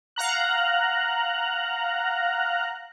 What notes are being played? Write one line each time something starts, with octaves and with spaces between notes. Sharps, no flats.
F5 F#5 A#5 F#6